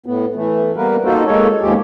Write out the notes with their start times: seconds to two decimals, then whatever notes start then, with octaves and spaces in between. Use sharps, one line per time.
0.06 A2 B3
0.36 E3 A3
0.77 G3 A#3 B3 A#4 B4
1.05 A#3 D#4 F4 F#4 A4 C5
1.26 G#3 A#3 D#4 A4 C#5
1.62 D#2 G#2 F3 G#3 G4